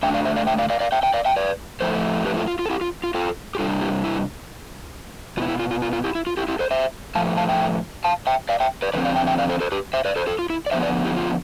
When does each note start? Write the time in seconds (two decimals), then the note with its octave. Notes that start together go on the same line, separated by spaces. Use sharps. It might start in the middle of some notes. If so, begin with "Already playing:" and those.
0.03 D3 A3 D4 E5 G5
0.14 D5 F5
0.25 C5 E5
0.36 D5 F5
0.47 E5 G5
0.58 D5 F5
0.70 D5 F5
0.80 D5 F5
0.92 E5 G5
1.03 E5 G5
1.14 D5 F5
1.25 E5 G5
1.36 B4 D5
1.80 A2 F3 A3 E4 A4 C5
2.25 G4 B4
2.36 F4 A4
2.48 F4
2.59 F4
2.66 A4
2.70 E4 G4
2.81 F4
3.04 F4
3.14 F4 A4
3.55 G4
3.59 C3 G3 D4 F4 A4
3.81 E4 G4
4.04 E4
5.37 B2 B3 E4 F4
5.48 E4
5.60 F4
5.71 F4
5.82 F4
5.93 F4
6.04 E4 G4
6.15 E4
6.27 F4
6.37 E4 G4
6.48 E4 G4
6.59 A4 C5
6.71 C5 E5
7.15 A2 F3 A3 F5 A5
7.37 F5 A5
7.49 E5 G5
8.04 F5 A5
8.27 E5 G5
8.49 D5 F5
8.60 E5 G5
8.82 B4 D5
8.93 D3 F3 A3 C4 B4 D5
9.05 D5 F5
9.16 E5 G5
9.27 E5 G5
9.38 D5 F5
9.49 A4 C5
9.60 A4 C5
9.72 G4 B4
9.94 C5 E5
10.05 B4 D5
10.16 A4 C5
10.27 F4 A4
10.39 F4
10.50 E4
10.66 D5
10.71 D3 F3 B3 C5 E5
10.83 B4 D5
11.05 E4 G4
11.16 F4